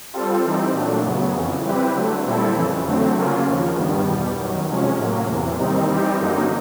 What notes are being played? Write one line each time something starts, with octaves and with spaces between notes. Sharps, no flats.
G3 C4 F4 A4
E3 G3 C4 D#4
A#2 F#3 A3 D4
F#2 C#3 F#3 B3
F2 C#3 E3
G3 C4 E4 G4 B4
D3 F#3 A3
A#2 G3 C4 E4 A4
F2 C#3 E3
D3 F#3 A3 C4
C#3 F#3 A#3 C#4 F4
D#2 C#3 F3
G2 D#3 G3 B3
E2 B2 G3
F#2 D#3 F#3
C3 F3 G#3 C#4
A2 F#3 A#3
E2 C3 E3
D#2 D#3 G3 C4 D#4
E3 G3 C4 D#4 G4
F#2 D3 F#3 A#3 D#4